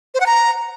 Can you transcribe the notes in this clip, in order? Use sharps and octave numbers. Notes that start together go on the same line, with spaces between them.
C5
F#5
A#5